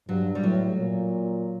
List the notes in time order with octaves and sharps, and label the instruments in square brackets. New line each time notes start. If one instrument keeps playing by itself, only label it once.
[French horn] G2 [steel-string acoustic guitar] F#3
[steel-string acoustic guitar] G3
[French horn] A2 [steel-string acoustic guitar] F#3
[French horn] A#2